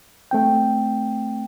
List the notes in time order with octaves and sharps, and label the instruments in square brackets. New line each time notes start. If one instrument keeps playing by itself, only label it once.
[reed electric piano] A3 C4 G5